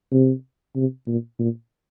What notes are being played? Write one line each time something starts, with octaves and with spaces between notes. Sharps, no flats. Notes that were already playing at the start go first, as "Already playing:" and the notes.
C3
C3
A#2
A#2